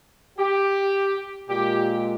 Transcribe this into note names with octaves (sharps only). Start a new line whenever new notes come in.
G4
A#2 G#3 G4